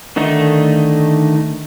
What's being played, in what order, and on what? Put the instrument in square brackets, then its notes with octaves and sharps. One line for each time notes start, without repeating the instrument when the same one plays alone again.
[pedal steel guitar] D3 D#3 A3 D#4